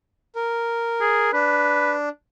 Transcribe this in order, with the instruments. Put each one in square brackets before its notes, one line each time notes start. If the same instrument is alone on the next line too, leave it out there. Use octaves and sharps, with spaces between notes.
[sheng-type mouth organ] A#4
[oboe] G#4
[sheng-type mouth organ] D4 [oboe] B4